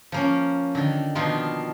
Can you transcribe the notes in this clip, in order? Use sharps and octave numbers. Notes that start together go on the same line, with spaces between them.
F3 A#3 C#4
D3 D#3
B2 D#3 F3 D4 D#4 F4